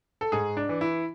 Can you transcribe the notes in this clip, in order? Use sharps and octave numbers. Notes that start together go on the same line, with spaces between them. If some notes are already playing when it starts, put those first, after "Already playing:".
A4
G#2 G#4
D4
E3
E4